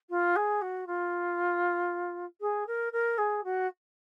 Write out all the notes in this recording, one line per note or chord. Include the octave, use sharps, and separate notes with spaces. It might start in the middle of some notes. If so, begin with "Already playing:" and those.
F4
G#4
F#4
F4
G#4
A#4
A#4
G#4
F#4